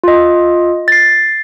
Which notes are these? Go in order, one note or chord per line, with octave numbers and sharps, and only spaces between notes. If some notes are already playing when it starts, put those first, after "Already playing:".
F4 D#5
A6 C7